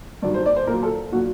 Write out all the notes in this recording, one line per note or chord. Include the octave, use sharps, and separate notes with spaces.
G2 D#3 F#3 D5
C5
D5
C5
A#2 A#4
F#3
A4
A#2 F#3 F#4